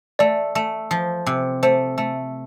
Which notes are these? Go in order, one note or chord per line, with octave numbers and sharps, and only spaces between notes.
A3 D5
A3
F3
C3
A3 C5
A3